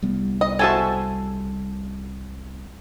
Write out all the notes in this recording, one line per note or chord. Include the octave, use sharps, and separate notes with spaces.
C2 G3 B3
D#5
F#4 A4 C5 E5 G#5 A5